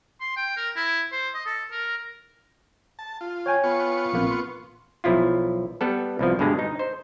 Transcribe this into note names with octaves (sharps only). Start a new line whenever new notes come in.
C6
G5
A#4
E4
C5
D#5
A4
A#4
A5
F4
C#5 G5 G#5
B3 F4 C#6
A#1 A#3 C4
C6
B1 F3 E4 F4
G3 B3 A4
C2 B2 F3
G2 B2 D3 G#3
D#4
C5